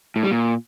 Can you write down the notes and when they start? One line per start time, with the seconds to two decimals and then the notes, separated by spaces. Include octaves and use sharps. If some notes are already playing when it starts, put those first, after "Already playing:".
0.16 A2
0.23 G3
0.31 A#2